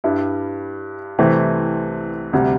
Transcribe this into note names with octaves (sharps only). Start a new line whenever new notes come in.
G2 G3 E4
C2 C3 E3 A3 C4
D2 C3 G3